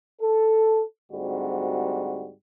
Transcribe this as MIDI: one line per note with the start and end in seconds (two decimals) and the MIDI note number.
0.22 0.83 69
1.12 2.32 38
1.12 2.32 44
1.12 2.32 55
1.12 2.32 60
1.12 2.32 66